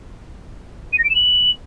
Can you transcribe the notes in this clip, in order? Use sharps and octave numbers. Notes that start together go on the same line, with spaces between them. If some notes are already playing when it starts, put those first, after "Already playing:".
D#7
A#6
D7
E7
F#7